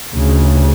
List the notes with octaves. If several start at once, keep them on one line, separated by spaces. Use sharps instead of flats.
D2 C#3